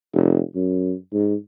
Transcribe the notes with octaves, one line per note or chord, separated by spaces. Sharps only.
F1
F#2
G#2